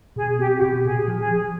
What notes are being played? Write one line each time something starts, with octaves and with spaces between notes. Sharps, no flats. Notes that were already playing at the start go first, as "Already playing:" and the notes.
B2 G#4
C4 G4
F#4
B2 G4
A#2 G#4
F3
G#4
F3